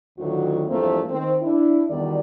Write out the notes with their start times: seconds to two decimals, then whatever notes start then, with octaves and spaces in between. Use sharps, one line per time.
0.19 D2 A2 D#3 F#3 F4 F#4
0.68 E2 G2 F3 A3 A#3 C4
1.10 D#3 C4
1.42 D4 E4
1.88 E2 B2 D#3 G3 D5